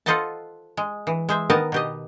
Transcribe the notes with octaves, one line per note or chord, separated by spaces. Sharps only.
F4 A4 C5 D#5 F#5 A5
G#3
E3
G#3 C5 E5
D#3 B3 A#4 D#5 A5
B2 G4 D#5